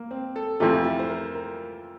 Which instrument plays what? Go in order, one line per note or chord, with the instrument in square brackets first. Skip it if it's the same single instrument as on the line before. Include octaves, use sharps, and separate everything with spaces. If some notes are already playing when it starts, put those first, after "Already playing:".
Already playing: [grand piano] A#3
C4
A4
[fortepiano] F2 C3 E3 A3 [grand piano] F4
[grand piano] E4
C5
A#4
A#4